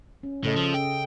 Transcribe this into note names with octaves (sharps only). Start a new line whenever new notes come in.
C#4
A2 C#3 A4 D#5
F3
G5